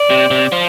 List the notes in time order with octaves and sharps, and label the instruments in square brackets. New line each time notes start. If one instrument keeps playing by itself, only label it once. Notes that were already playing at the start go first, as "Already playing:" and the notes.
Already playing: [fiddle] D5
[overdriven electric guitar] C3
C3
F3